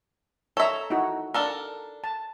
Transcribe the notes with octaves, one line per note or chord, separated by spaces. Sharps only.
A4 C#5 E5 A#5
D#4 E4 F#4
D4 A4 A#4
A5